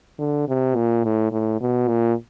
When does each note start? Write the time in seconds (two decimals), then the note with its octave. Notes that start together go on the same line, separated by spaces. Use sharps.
0.19 D3
0.48 C3
0.75 A#2
1.04 A2
1.32 A2
1.61 B2
1.88 A#2